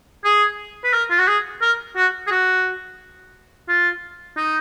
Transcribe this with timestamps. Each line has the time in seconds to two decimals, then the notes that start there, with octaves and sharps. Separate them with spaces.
0.24 G#4
0.84 B4
0.93 A#4
1.10 F4
1.19 F#4
1.27 G#4
1.62 A#4
1.96 F#4
2.27 G#4
2.31 F#4
3.68 F4
4.37 D#4